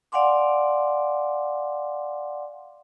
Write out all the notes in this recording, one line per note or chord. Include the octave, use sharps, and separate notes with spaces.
D5 F5 F#5 G#5 C6 D6